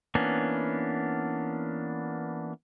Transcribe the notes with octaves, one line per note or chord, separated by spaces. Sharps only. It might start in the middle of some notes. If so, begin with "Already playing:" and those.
E3 A#3 B3 C#4 D4